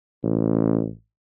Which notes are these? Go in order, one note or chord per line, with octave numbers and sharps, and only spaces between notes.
A1